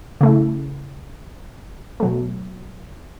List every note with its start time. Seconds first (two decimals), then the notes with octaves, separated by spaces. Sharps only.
0.21 C#3 A3 E4
2.00 B2 F#3 A3